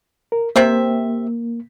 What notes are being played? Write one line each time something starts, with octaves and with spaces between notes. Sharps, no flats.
A#4
C3 A#3 C4 E5